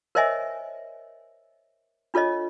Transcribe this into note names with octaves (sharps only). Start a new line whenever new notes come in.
A#4 C5 C#5 D#5 E5 G#5
D4 F4 A4 C#5 D#5